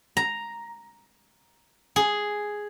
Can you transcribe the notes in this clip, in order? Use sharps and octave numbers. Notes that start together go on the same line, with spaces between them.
A#5
G#4